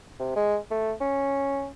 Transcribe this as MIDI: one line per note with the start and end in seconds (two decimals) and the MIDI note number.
0.19 0.33 48
0.36 0.57 56
0.70 0.92 57
1.01 1.69 61